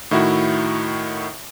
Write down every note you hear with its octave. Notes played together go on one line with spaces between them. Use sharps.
A2 D#3 E4 F#4